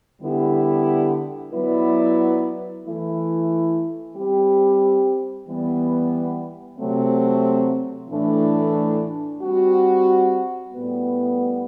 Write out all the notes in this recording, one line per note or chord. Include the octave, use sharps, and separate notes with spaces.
D3 G3 B3 E4 G4
F#3 B3 E4 B4 D5
E3 A3 E4
G3 C4 G4
E3 G3 B3
C3 F#3 A3 C4
A2 E3 A3 D4
G3 C4 F#4
A2 G3 B3